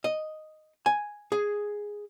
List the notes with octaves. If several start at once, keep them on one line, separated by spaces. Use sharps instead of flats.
D#5
G#5
G#4